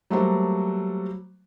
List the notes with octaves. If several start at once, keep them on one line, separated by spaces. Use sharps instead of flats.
F#3 G3 A3 A#3 F#4 C5